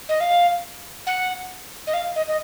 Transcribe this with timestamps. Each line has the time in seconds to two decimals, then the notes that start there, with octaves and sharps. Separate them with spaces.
0.09 D#5
0.20 F5
1.06 F#5
1.87 D#5
1.93 F5
2.16 D#5
2.28 D#5